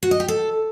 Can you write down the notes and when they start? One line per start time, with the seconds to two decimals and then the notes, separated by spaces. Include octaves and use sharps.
0.03 F#4
0.11 D#5
0.20 G4
0.28 A4